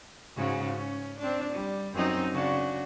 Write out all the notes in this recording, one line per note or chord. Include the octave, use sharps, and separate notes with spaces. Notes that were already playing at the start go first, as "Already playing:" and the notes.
G#2 C#3 F#4
C#4
C4 D4
G3
F#2 C4 D#4
C#3 D4 F#4